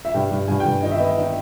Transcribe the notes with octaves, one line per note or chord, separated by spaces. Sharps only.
E5
G2 G5
G2
G2 G#5
G5
G2
D#4 D#5
E5
B3 D#5
D#4